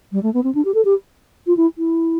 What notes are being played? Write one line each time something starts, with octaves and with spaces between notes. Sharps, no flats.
G3
A3
B3
C4
D4
G4
A4
G4
F4
E4
E4